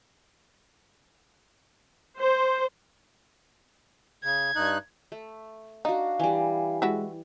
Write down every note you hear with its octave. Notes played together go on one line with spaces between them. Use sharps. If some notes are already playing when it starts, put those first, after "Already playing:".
C5
C#3 G#6
G2 D#4 F#6
A3
D4 D#4 F#4 F5
E3 G3 G4 G#5
G#3 E4 F#4 E5